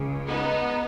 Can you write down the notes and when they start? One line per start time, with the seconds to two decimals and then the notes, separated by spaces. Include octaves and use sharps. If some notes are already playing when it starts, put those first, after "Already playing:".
Already playing: C#2 C#3
0.27 B3 D#4